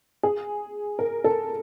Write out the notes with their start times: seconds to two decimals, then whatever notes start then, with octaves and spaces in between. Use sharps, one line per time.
0.23 G#4
0.99 A#4
1.24 A4